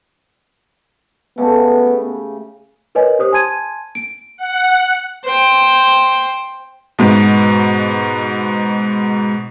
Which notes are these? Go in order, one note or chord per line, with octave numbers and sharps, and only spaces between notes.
C#3 A3 B3 G4
A#4 B4 C#5 D#5 G#5
G4 C5 D#6
G#5 A5 C6 G#6 D#7
D7
F#5
C5 G5
G#2 B2